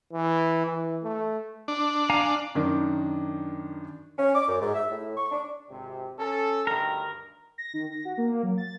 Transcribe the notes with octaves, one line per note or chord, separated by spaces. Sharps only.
E3
E3
A3
D4
F5 G#5 A#5
F#2 D#3 D4
C#4
D6
F#2
G#2
E5
A2
C#6
D4
G#1 C3
C#4 A4
D2 G2 D#3 A#4
A#6
D#3
A#6
F#4
A#3
F#3
A6